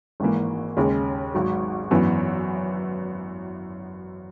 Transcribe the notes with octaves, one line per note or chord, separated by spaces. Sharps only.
G#1 G#2 E3 A#3
D#2 C#3 G#3
G#1 G#2 F#3
G#1 F#2 E3 B3